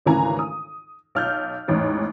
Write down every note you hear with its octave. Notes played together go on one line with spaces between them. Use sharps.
G#1 D2 C#3 E3 G#5 A#5
D#6
B1 F6 G6
A1 E2 G#2